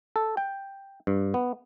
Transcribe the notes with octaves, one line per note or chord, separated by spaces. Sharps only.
A4
G5
G2
B3